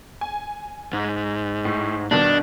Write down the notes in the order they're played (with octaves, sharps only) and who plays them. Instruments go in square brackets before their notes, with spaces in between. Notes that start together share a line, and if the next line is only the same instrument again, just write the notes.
[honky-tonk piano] G#5
[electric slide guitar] G#2
[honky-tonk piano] A2
[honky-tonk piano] G2 B2 D#3 [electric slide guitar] D4